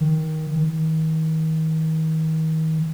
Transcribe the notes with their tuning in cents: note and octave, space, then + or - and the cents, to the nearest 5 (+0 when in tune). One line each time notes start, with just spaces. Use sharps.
D#3 +15
D#3 +35